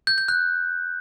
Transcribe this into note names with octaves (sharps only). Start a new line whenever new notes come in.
G6
G6
F#6